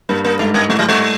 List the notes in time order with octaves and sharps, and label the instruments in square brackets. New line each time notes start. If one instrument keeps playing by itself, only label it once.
[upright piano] G2 [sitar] A#3
[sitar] A#3
[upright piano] G#2 [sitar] A3
[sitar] G#3
[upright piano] A2 [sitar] G3
[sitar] F#3
G3